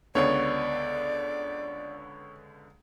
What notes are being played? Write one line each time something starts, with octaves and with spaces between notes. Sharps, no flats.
C#2 D3 B3 C#5 D5